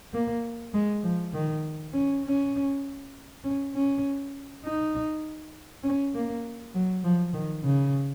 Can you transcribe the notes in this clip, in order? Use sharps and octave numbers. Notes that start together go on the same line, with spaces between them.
A#3
G#3
F3
D#3
C#4
C#4
C#4
C#4
D#4
C#4
A#3
F#3
F3
D#3
C#3